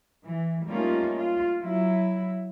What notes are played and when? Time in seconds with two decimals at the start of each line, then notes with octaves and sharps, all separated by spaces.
0.23 E3
0.66 G3 A3 A#3 C#4 D#4 F4
1.16 F4
1.59 F#3 E4